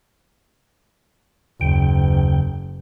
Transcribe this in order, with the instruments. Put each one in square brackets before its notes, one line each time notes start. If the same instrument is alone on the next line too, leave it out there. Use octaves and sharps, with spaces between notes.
[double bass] F#1 [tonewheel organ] D#2 C#3 G5